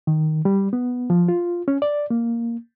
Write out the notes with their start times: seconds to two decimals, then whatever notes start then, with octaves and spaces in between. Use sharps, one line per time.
0.07 D#3
0.45 G3
0.73 B3
1.10 F3
1.28 F4
1.68 C#4
1.82 D5
2.10 A#3